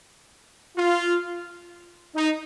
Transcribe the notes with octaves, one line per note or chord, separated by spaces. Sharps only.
F4
D#4